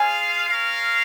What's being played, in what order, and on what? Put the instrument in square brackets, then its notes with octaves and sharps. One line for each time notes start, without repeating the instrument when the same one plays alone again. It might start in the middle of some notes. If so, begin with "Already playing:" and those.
Already playing: [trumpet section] F4 G#4 F5 [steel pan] G#5
[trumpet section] C#4 A#4 F5